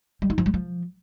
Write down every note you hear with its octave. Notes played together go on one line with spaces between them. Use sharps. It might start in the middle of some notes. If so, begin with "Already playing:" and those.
G3
D#4
F3
G3
F3